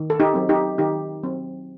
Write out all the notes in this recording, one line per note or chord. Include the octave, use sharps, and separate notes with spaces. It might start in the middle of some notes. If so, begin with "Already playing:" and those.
Already playing: D#3
A4
D#4 G4
F#3 C4
D#4 G4
D#3 D#4 G4
F#3 C4